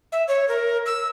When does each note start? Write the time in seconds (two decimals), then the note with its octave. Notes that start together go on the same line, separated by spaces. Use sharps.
0.12 E5
0.28 C#5
0.48 A#4
0.86 E6